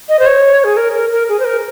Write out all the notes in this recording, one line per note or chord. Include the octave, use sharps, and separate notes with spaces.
D#5
C5
C#5
G#4
A#4
A#4
A#4
G#4
C5
A#4